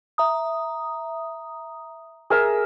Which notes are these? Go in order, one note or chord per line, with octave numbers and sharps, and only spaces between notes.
E5 A#5 D#6
G#4 A#4 E5